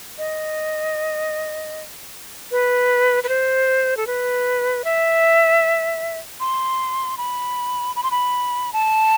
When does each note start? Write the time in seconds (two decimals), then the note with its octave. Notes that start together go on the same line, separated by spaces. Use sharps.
0.18 D#5
2.51 B4
3.24 B4
3.29 C5
3.97 A4
4.07 B4
4.84 E5
6.40 C6
7.18 B5
7.96 B5
8.03 C6
8.11 B5
8.73 A5